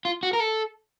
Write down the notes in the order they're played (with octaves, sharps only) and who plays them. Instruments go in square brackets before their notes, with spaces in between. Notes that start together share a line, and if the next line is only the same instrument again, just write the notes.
[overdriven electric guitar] F4
F#4
A#4
A4